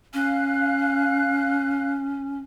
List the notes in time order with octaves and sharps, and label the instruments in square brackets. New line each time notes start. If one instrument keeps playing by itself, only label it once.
[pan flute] C#4 [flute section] F5 F#6